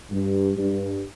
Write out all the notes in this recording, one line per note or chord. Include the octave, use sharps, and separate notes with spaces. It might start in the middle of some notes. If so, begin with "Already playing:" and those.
G2
G2